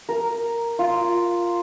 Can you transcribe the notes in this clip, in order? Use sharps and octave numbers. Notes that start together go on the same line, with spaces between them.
A#4
F4